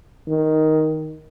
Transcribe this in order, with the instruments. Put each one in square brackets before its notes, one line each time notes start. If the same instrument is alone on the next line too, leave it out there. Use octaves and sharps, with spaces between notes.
[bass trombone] D#3